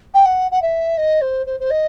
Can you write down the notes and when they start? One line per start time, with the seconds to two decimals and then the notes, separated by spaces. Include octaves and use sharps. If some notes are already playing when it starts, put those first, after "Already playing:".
0.14 G5
0.25 F#5
0.51 F#5
0.62 E5
0.97 D#5
1.21 C5
1.46 C5
1.60 C5
1.70 D#5